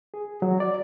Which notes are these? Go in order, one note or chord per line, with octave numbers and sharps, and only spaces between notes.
G#4
F#3
D5